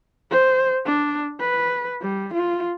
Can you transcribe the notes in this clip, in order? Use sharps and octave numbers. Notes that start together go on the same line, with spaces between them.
C5
D4
B4
G3
F4